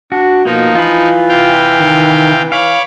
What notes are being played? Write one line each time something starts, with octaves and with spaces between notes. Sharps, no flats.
D4 F#4
B2 F3 A#3 D#4
E3 F4 B5
C3 F5 G5
D#3
C#5 F5 B5 D6